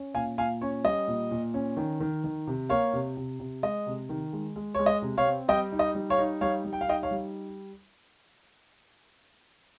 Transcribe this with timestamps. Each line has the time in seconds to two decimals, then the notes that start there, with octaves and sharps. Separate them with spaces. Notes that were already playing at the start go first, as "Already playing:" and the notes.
Already playing: C#4
0.14 A#2 F5 G#5
0.38 A#2 F5 G#5
0.61 C#4 C#5
0.85 G3 D#5
1.07 A#2
1.31 A#2
1.54 C#4
1.77 D#3
2.00 D#3
2.24 D#3
2.47 C3
2.69 A#3 C#5 F5
2.93 C3
3.17 C3
3.40 C3
3.63 G#3 D#5
3.86 C3
4.09 D#3
4.33 G#3
4.56 G#3
4.75 G#3 C#5
4.86 D#5
5.02 C3
5.18 C#5 F5
5.25 C4
5.48 G3 D#5 G5
5.72 D#4
5.79 D#5
5.95 G3
6.10 C#5 F5
6.18 D#4
6.41 G3 C#5 F5
6.64 G3
6.73 G5
6.81 F5
6.88 D#4 D#5 G5
7.03 C#5 F5
7.11 G3